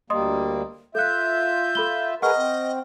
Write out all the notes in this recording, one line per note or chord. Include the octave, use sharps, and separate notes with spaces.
D2 G3 A#3 D#5 C6 D#6
F4 A4 E5 F#6 G6
A4 B5 G7
G#4 A#4 B4 D#5 F#5 C#6 F6
C4